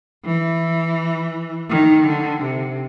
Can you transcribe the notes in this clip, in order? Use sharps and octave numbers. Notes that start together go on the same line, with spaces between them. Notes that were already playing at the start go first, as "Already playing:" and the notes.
E3
D#3
D3
C3